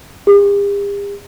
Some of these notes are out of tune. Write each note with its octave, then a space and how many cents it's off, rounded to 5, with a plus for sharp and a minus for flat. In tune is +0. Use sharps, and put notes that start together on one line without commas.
G4 +45